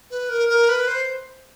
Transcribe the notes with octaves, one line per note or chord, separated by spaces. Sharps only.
B4
A#4
A#4
B4
C5